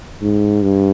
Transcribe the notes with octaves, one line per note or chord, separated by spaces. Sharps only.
G#2
G2